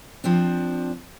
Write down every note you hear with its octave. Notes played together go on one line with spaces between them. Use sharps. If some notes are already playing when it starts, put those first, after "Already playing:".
F3 C4 D4